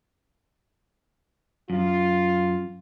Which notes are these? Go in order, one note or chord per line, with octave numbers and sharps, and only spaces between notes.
F#2 F4